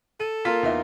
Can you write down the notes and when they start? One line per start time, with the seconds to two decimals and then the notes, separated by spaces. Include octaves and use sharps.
0.20 A4 D#7
0.45 A#3 F4 B6
0.63 E2 D#4 E5